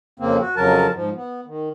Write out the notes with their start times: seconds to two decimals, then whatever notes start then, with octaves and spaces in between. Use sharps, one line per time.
0.20 F2 C#3 A#3 C4
0.40 F#4
0.56 F2 C#3 F#3 A#4 A5
0.95 G#2 F3
1.15 B3
1.46 D#3